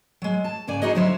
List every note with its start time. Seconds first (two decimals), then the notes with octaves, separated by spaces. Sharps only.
0.22 F#3 G#3
0.44 A5
0.67 G#2 C#3 D5 G#5
0.82 D#4 E4 F#4 G#4 C5 D#5
0.95 D3 F#3 G3 C5 C#5 E5